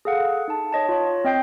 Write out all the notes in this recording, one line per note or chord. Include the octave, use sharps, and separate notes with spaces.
G#4 A4 F5 F#5
D#4 A5
C#5 D#5 A5
F4 C#5
C4 D#5 G5 G6 C7